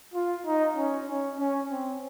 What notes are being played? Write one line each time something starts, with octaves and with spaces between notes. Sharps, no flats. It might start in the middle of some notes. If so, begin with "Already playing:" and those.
F4
D#4
C#4
C#4
C#4
C4